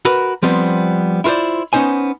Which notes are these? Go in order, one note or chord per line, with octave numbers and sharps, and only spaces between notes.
F#4 A#4 B4
F3 G3 B3 C4
E4 F4 A#4 C5 D5
B3 C#4 D#4 C5 G#5